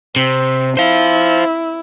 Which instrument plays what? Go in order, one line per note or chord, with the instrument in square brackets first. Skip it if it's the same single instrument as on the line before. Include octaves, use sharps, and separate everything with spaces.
[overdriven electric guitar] C3 [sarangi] C4
[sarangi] E4 [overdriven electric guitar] C5 F5